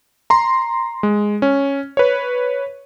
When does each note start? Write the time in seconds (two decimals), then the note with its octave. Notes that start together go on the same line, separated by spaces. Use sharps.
0.30 A#5 C6
1.03 G#3
1.42 C#4
1.97 B4 C#5